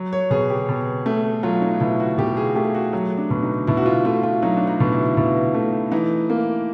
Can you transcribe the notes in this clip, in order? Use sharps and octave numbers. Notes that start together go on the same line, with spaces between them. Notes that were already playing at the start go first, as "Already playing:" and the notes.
Already playing: F#3
C#5
B2 G#4
G4
B2
A3
F#3 F4
D#4
B2 E4
F#4
B2 G4
G#4
A3 G4
F#4
F#3
D4
B2
D#4
B2 E4
F#4
F4
A3 F4
F4
F#3 D#4
D4
D#4
B2
E4
B2 E4
A3
E3 D#4
A#3